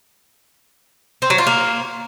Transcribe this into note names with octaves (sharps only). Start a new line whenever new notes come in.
C4
F#3
F4
A#3